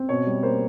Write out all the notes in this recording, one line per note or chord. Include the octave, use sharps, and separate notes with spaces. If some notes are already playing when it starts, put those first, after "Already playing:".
Already playing: C4
B2 C#5
G3
A#3 C5